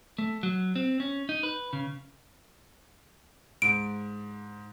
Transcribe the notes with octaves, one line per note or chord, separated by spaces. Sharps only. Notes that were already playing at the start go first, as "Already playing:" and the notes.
A3
F#3
C4
C#4
D#4
B4
C#3
G#2 D7